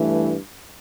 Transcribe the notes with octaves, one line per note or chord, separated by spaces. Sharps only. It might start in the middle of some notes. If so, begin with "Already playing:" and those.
Already playing: G2 E3 A3